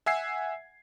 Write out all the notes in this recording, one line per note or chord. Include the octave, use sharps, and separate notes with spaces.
E5 F#5 G#5 E6 G#6 C7